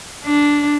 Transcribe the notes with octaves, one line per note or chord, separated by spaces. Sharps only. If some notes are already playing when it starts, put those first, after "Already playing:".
D4